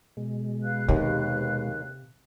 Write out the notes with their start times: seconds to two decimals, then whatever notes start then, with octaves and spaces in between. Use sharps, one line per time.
0.17 B2 G#3
0.62 B4 F5 F#6
0.89 D#2 C3